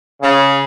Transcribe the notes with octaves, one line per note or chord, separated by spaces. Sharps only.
C#3